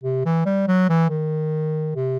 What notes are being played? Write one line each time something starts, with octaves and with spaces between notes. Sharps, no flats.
C3
E3
G3
F#3
E3
D#3
C3